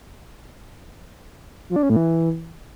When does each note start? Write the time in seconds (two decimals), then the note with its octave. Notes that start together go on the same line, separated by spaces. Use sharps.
1.69 F3
1.76 D4
1.83 C#4
1.90 A2
1.96 E3